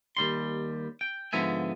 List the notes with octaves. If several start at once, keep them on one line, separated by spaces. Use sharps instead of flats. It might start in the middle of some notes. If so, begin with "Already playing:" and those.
D#2 G3 C6
G5
G#2 D3 F3 B3 E5 G#5